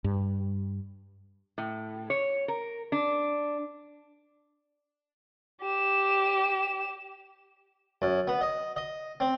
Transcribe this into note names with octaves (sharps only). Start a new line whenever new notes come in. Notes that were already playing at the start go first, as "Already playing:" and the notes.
G2
A2
C#5
A#4
D4
G4 E7
F#2
B3
D#5
D#5
C4